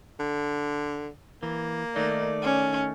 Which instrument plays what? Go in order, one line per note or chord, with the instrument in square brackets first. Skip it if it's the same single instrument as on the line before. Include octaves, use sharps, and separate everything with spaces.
[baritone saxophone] D3
[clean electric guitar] E3 [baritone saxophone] A#3
[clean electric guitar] D#3 A3 D#4 [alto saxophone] D5
[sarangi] C#4